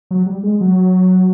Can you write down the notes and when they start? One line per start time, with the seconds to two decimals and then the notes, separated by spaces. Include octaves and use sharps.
0.11 F#3
0.26 G3
0.43 G#3
0.61 F#3